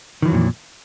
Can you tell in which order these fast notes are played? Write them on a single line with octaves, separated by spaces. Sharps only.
D#3 E3 F#3 F2 A#2